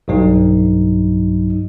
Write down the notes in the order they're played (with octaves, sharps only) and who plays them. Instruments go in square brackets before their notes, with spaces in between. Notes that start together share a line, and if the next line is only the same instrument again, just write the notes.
[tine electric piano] B1 G2 F#3 D#4